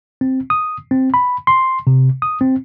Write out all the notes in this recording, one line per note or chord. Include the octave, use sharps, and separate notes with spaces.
C4
D#6
C4
B5
C6
C3
D#6
C4